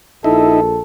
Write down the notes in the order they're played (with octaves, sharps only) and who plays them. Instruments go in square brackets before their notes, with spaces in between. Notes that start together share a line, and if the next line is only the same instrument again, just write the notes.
[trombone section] A#1 A4 [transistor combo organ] D#4 E4